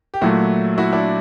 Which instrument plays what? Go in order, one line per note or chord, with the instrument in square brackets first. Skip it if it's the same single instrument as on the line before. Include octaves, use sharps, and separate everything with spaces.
[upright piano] G4
[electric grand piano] A#2 F#3 A3 [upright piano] E4 F#4
[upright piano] E4 F#4
D4 E4